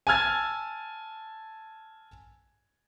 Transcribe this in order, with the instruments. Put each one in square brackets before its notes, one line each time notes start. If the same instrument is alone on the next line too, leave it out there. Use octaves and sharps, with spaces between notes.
[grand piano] G#5 A5 E6 F6 G#6 A6